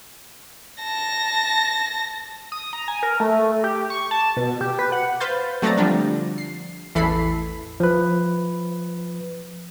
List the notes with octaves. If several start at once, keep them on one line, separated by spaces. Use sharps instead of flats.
A5 A#6
D#6
A#5
G#5
A#4
A3
G4
C#6
A5
B2
G4
B4
F#5
B4 C5 F5 G6 A6
F#3 A3 C4 D5 A#5 A6
D3 F3 G3 D4
C7
A1 E2 E3 A4 B5 C7
F3 B4